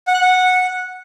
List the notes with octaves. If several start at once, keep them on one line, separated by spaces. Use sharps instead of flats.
F#5
F#6
F#5